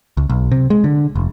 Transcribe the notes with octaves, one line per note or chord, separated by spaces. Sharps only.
C#2
B1
C3
G#3
D3
F1